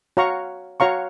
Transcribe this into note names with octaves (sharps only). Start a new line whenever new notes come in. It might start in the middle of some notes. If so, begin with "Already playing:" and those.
F#4 C#5 F5 A#5 C#6
F#4 C#5 F5 A#5 C#6